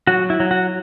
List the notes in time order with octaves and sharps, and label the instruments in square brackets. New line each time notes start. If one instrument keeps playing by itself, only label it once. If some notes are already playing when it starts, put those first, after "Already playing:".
[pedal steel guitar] F#3 F#4
E4
F#3
F#4